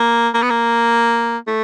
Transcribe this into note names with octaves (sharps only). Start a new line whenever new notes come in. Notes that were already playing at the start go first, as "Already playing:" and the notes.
Already playing: A#3
A#3
B3
A#3
A3